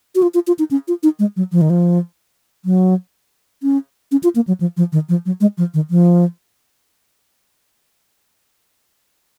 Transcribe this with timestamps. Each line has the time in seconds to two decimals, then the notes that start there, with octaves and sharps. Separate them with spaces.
0.15 F#4
0.22 F4
0.34 F4
0.47 F4
0.59 D#4
0.71 C#4
0.88 F4
1.03 D#4
1.19 G#3
1.36 F#3
1.52 F3
1.61 D#3
1.70 F3
2.65 F#3
3.63 C#4
4.12 C#4
4.23 F4
4.35 A#3
4.47 F#3
4.60 F3
4.77 F3
4.92 D#3
5.09 F3
5.26 F#3
5.41 G#3
5.58 F3
5.74 D#3
5.90 F3